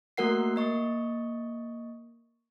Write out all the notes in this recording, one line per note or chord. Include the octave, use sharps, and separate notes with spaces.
A3 A#3 F#4 A#4 F#5 C7
A#3 D#5 C#6